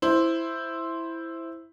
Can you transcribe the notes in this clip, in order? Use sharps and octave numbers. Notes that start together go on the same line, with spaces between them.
E4 C5